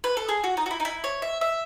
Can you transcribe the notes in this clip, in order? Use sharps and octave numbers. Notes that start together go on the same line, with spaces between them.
B4
A4
G#4
F#4
D#4
F#4
E4
D#4
E4
C#5
E5
E5